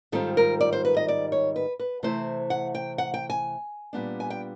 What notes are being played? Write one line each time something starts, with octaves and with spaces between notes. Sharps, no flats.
G#2 D#3 G3 C4 F4 A4
A#4
D5
C5
B4
D#5
D5
C#5
B4
B4
C3 E3 A3 C4 E4 C5
F#5
G5
F#5
G5
G#5
A#2 G3 B3 D4
G#5
G5